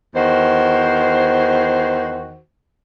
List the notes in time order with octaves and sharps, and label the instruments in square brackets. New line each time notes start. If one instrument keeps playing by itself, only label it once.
[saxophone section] E2 D#3 F#4 C5